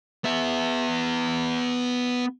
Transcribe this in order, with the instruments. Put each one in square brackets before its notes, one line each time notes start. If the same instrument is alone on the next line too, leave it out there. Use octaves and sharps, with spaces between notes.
[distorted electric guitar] B3 E5